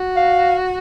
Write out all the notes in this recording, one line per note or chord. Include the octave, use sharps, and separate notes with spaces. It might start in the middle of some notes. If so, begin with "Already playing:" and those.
Already playing: F#4
F5